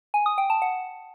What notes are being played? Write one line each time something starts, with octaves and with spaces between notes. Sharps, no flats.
G#5
D#6
G5
A5
F#5